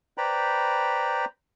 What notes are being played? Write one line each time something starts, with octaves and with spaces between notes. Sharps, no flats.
B4 C5 D5 G5 A#5 B5